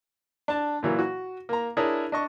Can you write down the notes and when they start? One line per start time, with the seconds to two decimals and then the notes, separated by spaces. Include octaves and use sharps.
0.48 D4 A5
0.83 A#2 E3 F#3 A#3
0.99 F#4
1.49 A#3 A#5
1.77 D4 E4 G#4 A#4 C#5
2.12 D4 D#5 C#6